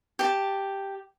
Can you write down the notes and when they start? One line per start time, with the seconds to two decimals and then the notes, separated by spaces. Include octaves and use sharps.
0.19 G4 A5